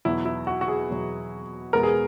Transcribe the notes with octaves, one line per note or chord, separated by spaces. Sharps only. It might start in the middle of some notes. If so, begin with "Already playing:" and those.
E2 B2 F#3 E4
E4
F#4
F#4
G#4
E2 B2 F#3
E2 B2 G#3 B3 A#4
G#4